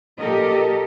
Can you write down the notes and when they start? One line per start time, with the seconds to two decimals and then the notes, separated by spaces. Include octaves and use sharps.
0.19 A#2 G4 A4 A#4 D#5